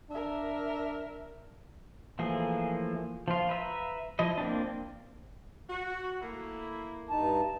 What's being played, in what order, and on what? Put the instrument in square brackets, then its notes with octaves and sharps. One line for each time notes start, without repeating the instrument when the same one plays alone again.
[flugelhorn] D4 [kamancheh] A#4 E5
[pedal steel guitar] E3 F3 A3 A#3 G#4
F3 F4
B4 E5 A#5
F3 E4 D#5
A#3 C4 D4
[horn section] F#4
A3 A#3 E4
[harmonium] G2 D#4 A5